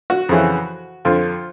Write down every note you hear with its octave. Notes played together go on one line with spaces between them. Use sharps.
F#4
F2 C#3 E3
F2 D3 F4